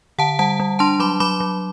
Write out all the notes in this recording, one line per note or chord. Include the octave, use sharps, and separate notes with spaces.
D3 F#5 A5
G3 F#5 A5
G3
D4 A5 C6
F#3 B5 D6
F#3 B5 D6
F#3